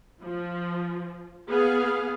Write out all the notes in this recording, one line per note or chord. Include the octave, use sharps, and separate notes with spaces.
F3
B3 G#4 F5